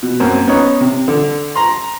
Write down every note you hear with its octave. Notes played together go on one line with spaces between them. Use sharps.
B2
F#2 A#3 C4
B3 C#4 D#4 C#5
C3
D3
A#5 C6